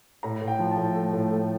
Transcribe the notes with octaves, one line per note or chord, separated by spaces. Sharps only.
A2 A#5
A2
G5
F3
A5
A2
A3
A2
A3